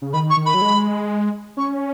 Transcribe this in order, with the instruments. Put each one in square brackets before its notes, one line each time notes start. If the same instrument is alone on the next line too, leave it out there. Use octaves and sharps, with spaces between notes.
[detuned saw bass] C#3
[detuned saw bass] D#3 [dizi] B5
[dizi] C#6
[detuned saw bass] D#3
[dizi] B5
[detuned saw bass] F#3
G#3
[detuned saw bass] C#4 [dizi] C#6